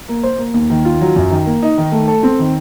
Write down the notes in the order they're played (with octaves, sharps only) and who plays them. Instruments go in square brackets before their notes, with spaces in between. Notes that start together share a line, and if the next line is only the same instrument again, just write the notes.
[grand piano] A#3
C5
A#3
D#2
D#3
F4
F#3
F#2
D#3
A#3
D#4
D#3
A3
A4
C4
D#3